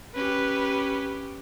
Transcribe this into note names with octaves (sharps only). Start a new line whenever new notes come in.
C#4 G4 B4